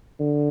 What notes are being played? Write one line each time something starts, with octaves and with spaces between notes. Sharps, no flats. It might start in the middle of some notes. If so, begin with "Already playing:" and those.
D3